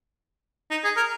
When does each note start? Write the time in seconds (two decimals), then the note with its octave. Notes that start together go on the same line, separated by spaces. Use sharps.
0.71 D#4
0.84 G#4
0.97 A#4